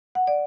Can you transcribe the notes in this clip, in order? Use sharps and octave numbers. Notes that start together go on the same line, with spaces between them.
F#5
D5